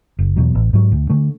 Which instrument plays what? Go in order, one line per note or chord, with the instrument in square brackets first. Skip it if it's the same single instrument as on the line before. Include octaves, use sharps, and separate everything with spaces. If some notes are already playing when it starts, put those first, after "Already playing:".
[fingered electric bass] F#1
E2 B2 F#3
A1
G#2 F#3
D2
D3 A3